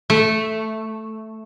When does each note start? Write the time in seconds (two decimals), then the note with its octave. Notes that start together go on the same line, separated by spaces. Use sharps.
0.10 A3